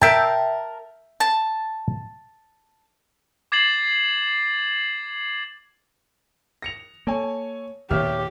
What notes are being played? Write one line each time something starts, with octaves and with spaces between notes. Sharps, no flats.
A#4 E5 G5 A5
A5
D6 G#6 A6 C7 E7 F#7
A#6 C#7 F7
A#3 A4 C#5 G#5
D#2 A#2 D#3 G4 C#5 E5 F6